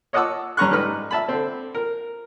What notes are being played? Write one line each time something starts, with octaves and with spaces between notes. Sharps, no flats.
C#5 D#5 F#5 A5 D6 E6
G2 C#4 A#5 C#6 F#6
G#2 G3 B4 F6
E5 A5 B5
D3 C4
A#4